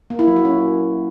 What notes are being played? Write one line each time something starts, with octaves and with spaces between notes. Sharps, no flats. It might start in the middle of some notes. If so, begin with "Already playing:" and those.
A#3
E4
F#3
F#4
C#4